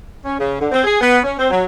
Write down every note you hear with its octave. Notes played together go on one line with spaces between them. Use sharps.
C#4
C#3
D3
C4
G#4
B3
C#4
C4
F#3